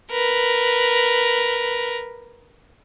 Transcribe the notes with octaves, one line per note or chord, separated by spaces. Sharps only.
A#4 B4